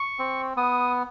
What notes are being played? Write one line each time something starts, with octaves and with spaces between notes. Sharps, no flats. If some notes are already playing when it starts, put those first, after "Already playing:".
Already playing: C#6
C4
B3 D#6